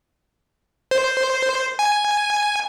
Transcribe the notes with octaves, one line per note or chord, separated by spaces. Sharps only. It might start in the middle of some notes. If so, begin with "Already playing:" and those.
C5
G#5